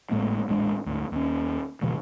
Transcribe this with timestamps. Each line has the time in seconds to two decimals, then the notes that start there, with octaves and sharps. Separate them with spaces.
0.11 G#1 A2 G#3 A#3
0.48 D#1 A1 G#3 D4
0.86 D2 G#2
1.12 D#2 C#4
1.81 D2 G2 B2 E3